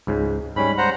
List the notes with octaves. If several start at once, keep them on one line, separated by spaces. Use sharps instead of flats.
C#2 G#2 C#3
G#2 G3 C#4 B5
C5 F#5 A#5